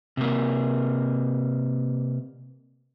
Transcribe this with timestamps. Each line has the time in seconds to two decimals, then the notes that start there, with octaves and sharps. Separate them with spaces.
0.17 C3 A#3